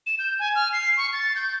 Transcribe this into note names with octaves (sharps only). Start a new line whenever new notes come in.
E7
G6
G#5
F6
C7
C#6
A6
G6